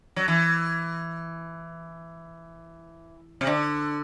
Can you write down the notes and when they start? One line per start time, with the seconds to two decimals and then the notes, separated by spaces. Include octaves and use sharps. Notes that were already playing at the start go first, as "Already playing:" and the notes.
0.16 F#3
0.28 E3
3.41 C3
3.47 D3